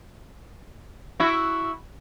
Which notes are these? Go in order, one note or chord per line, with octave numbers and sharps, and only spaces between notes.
E4 F#4